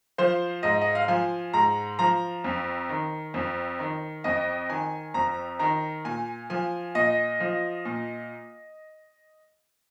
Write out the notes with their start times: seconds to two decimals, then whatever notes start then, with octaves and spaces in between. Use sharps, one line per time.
0.18 F3 C5
0.63 G#2 D#5
0.81 D#5
0.95 F5
1.08 F3 G#5
1.53 G#2 A#5
1.99 F3 A#5
2.44 F2
2.89 D#3
3.34 F2
3.79 D#3
4.24 F2 D#5
4.69 D#3 G#5
5.14 F2 A#5
5.59 D#3 A#5
6.05 A#2 G#5
6.50 F3 G#5
6.95 A#2 D#5
7.40 F3
7.85 A#2